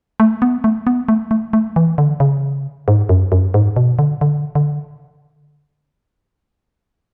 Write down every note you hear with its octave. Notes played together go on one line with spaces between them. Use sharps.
A3
B3
A3
B3
A3
A3
A3
E3
D3
C#3
G#2
F#2
F#2
G#2
B2
D3
D3
D3